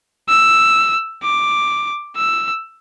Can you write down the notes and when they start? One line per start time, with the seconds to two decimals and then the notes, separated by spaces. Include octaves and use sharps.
0.29 E6
1.23 D6
2.17 E6